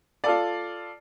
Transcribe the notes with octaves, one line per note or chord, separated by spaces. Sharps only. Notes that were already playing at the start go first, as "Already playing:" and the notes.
F4 A4 D5